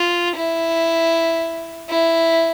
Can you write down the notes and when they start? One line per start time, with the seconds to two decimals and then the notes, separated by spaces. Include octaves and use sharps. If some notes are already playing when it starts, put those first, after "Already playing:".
Already playing: F4
0.36 E4
1.90 E4